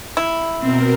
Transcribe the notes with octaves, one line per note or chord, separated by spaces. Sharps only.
E4
B2 C4 A#4